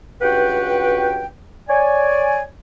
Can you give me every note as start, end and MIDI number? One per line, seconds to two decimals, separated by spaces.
0.22 1.26 37
0.22 1.26 43
0.22 1.26 66
0.22 1.26 71
0.22 1.26 78
0.22 1.26 79
1.69 2.42 73
1.69 2.42 74
1.69 2.42 80